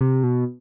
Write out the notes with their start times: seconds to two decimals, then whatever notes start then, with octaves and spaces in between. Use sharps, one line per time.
0.01 C3
0.23 B2